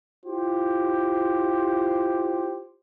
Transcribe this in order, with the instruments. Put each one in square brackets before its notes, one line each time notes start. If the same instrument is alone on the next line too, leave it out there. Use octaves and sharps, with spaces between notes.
[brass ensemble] E4 F4 G4 C5